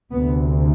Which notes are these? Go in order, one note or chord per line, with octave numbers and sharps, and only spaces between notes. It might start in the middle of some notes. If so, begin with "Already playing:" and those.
D2 C3 B3